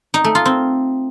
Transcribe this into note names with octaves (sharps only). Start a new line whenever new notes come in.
D#4
A3
F4
C4